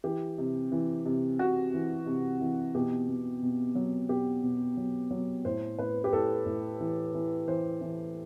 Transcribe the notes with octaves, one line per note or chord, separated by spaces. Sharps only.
E3 G4
C3
E3
C3
C3 F#4
E3
C3
E3
B2 G4
B2
B2
F#3
B2 G4
B2
F#3
F#3
A2 C5
A2 B4
G4
A2 A4
A2
E3
E3
E3 C5
E3